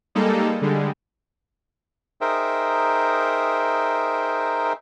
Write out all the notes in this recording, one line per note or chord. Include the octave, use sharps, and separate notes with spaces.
G3 G#3 A#3 D#4 A4
D3 G3 G#3
D#4 G#4 A#4 C5 E5 G5